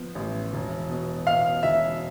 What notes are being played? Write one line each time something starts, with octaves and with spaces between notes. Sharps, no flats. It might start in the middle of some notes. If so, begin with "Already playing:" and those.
Already playing: F3 B3
A1
E1
B2
B2 F5
E1 E5